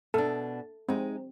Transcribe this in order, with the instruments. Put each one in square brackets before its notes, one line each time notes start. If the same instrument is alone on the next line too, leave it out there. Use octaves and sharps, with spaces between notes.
[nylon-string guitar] B2 D4 [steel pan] A4
[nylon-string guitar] G#3 D#4 [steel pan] C4